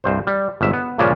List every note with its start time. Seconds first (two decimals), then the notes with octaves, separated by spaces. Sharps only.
0.04 C2 G2 C5
0.27 G3
0.61 G1 G#2 E5
0.73 B3
0.98 G2 A#2 C#3 F3 C#4 D4